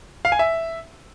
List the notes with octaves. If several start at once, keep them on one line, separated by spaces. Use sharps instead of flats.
F5
G#5
E5